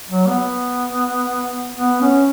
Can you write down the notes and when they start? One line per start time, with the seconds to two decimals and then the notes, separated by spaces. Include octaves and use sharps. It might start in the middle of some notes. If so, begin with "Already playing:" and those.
0.09 F#3
0.28 B3
1.77 B3
2.02 C#4